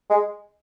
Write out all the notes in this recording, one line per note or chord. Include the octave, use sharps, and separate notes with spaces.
G#3